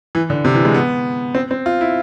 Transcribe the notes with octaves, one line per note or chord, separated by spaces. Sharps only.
E3
D3
C3
E3
G#3
B3
C4
C4
F4
E4